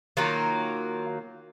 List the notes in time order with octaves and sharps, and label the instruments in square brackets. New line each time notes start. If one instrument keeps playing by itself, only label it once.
[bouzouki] D#3 F#3 A#3 F4